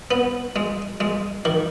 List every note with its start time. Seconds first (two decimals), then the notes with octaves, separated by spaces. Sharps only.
0.11 B3
0.56 G#3
1.00 G#3
1.45 D#3